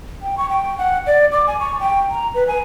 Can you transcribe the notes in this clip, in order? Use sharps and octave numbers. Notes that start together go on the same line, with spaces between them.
G5
C#6
G5
F#5
D5
D6
G#5
C#6
G5
A#5
B4
G#5